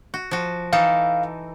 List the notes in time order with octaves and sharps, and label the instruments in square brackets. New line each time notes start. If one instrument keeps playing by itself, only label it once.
[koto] F#4
F3 F#4
[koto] E3 D#4 A4 [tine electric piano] F5